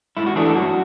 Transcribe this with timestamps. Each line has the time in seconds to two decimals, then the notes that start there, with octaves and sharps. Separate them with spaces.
0.17 G#2 E4
0.26 F#4
0.35 E3 A3 D4 G#4
0.45 A4
0.55 F#2 F#4